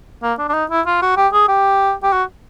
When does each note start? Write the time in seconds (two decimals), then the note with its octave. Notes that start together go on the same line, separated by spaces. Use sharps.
0.23 A#3
0.39 D4
0.49 D4
0.53 D#4
0.70 E4
0.86 F4
1.02 F#4
1.17 G4
1.33 G#4
1.48 G4
2.03 G4
2.13 F#4